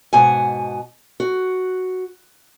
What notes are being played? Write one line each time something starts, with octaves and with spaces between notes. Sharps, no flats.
G#2 B2 F#5 G#5
F#4